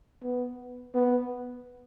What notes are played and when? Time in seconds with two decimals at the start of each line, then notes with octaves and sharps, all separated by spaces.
0.23 B3
0.95 B3